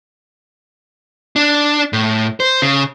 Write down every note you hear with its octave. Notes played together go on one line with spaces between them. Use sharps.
D4
A2
C5
C#3